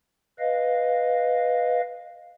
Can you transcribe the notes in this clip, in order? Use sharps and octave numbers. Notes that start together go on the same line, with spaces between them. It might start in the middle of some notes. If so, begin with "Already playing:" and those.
B4 D#5 F5